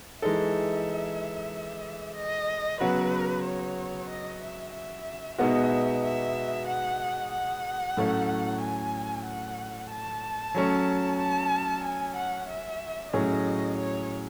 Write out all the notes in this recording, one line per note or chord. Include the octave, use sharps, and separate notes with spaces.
E3 G#3 D#4 A4 E5
D#5
C#3 F#3 B3 F#4 B4
C#5
D#5
E5
E5
B2 G#3 B3 D#4 F#4 E5
E5
F#5
F#5
A2 F#3 A3 C#4
G#5
F#5
A5
F#3 A3 C#4
A5
G#5
F#5
E5
A2 F#3 C#4 G#4 D#5
C#5